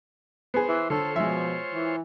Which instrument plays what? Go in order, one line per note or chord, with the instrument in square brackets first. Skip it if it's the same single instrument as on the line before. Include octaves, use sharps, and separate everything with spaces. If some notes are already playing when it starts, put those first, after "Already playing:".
[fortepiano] B3 G#4 [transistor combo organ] C5
[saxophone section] E3
[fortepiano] D3 [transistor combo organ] F4 C5 C#5 [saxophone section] A4
[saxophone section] B2 F3 [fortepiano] G#3 E5
[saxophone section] E3